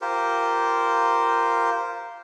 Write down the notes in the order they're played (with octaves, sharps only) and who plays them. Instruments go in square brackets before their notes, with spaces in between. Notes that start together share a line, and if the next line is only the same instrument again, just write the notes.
[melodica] F4 G4 A#4 C5